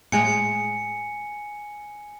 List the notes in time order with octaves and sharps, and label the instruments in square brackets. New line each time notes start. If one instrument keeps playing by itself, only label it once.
[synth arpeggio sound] A2 G#3 [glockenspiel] G#5 C#7